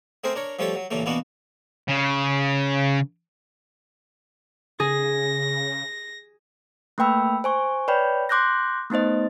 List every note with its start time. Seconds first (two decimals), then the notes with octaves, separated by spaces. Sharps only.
0.24 A3 C4 G#4 A#4 C5
0.35 D4 A#4 C#5
0.59 F3 G3 A3 A4 C#5 E5
0.76 F#3
0.91 A1 A#2 C#3 E3 A3 A#3
1.06 B2 E3 A#3 B3 D4 F#4
1.89 C#3
4.80 C#3 G#4 A#6
6.98 A3 A#3 B4 G5 B5 E6
7.44 C5 G#5 C#6
7.88 B4 C#5 D5 G5 B5 G6
8.29 C6 D6 F#6 G6 A#6
8.90 A3 B3 D#4 C5 D#5